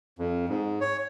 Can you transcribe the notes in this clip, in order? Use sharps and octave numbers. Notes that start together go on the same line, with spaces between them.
F2
G#2
C#5